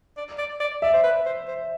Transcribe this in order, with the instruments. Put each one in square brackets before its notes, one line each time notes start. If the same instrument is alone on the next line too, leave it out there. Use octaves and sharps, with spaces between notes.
[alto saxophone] D5
D5
D5
[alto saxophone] D5 [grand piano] E5
[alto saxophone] C5
B4
C5
C5